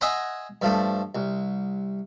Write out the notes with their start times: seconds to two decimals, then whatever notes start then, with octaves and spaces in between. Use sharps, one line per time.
0.01 D#5 E5 F#5 G#5 A#5 C6
0.62 G2 F3 A3
1.15 C2